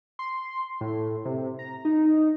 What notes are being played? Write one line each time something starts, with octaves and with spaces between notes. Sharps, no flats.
C6
A2
C3
A#5
D#4